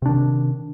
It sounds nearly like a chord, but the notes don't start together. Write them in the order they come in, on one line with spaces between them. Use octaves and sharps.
C3 D4 D#3